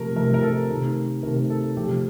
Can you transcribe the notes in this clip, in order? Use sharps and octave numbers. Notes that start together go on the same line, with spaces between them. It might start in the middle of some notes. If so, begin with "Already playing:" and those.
Already playing: C3 F3 A3 A#4
C3 F3 A3 A#4
A#4
A4
C3 D#3 A3
C3 D#3 A3 A#4
A4
C3 F3 A3 G4